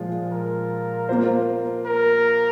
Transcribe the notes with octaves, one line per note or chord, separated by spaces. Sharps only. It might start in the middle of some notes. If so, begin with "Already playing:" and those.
Already playing: A#2 F3 G#3 F4
A#4
A#3 F4 C5
A#4